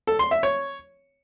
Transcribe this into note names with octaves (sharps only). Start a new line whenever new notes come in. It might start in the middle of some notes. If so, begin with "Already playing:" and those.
A4
C6
E5
C#5